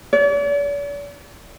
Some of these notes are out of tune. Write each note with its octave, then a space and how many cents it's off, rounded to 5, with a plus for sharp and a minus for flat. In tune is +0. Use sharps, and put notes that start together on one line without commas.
D5 -45